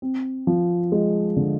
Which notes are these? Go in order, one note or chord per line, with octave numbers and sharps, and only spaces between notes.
C4
F3
G#3
D3